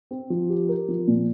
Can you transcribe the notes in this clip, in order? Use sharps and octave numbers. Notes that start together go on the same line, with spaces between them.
C4
F3
G4
A#4
F3
A#2